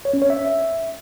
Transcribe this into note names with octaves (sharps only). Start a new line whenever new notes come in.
C#5
C#4
C#5
E5